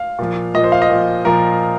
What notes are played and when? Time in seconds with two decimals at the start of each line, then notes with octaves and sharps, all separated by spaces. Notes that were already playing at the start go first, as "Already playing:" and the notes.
Already playing: F5
0.19 A#2 F3
0.54 A#2 F3 D#5
0.64 C5
0.72 F5
0.82 D#5
0.90 A#2 F3
1.25 A#2 F3 A#4